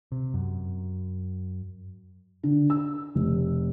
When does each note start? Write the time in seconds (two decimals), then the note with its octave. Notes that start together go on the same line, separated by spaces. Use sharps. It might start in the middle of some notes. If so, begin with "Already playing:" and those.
0.12 C3
0.34 F#2
2.43 D3
2.70 E6
3.15 F1